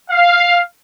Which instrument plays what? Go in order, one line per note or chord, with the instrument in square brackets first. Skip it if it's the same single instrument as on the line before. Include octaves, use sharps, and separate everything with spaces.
[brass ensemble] F5